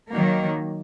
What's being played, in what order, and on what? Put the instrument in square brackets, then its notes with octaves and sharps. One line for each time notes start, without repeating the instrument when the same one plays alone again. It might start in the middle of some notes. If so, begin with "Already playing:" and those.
[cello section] D#3 F#3 A#3